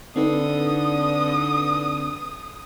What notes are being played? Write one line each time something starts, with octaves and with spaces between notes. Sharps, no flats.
D3 C4 D#4 B4 D#6